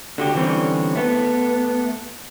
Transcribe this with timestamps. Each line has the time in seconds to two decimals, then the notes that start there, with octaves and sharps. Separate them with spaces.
0.18 D3 F#4 G4
0.35 D3 E3 G3 C4 C#4
0.95 A3 B3